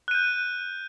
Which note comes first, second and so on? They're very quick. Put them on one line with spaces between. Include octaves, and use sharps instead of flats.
F#6 D#7 G6